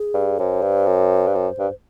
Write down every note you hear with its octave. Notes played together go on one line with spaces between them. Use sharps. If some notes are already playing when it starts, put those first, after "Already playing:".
Already playing: G#4
G2
F#2 C5
G2
F#2
G2
F#2
G2